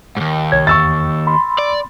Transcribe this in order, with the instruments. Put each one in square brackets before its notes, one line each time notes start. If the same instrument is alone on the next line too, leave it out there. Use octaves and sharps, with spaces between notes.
[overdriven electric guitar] D#2 G#2
[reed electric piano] C2 C#5 G#6
[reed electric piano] E2 [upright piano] C#6 E6 A6
[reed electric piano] B5 C6
[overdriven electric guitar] D5